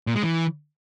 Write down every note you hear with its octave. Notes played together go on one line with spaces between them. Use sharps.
A#2
G#3
E3